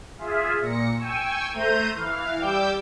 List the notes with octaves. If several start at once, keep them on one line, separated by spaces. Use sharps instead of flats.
F4 G#4 E5
A#2 A#6 C#7
G5 G#5 C#6 E6
A3 C5 A#5 G6 D#7
E3 F5
G3 G5 D6 E6 G6